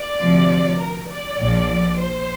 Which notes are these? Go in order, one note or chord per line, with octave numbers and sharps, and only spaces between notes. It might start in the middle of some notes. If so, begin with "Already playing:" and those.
Already playing: D5
D2 C3 F3
A#4
D5
A#1 A#2 F3
C5